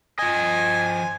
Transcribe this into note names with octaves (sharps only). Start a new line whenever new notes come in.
F3 D#5 G#5